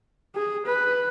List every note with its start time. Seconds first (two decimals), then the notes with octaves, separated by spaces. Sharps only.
0.35 G#4
0.66 B4